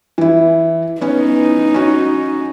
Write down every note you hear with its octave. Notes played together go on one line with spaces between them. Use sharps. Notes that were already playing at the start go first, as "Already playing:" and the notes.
E3 E4
B3 C#4 D#4
C#4 F#4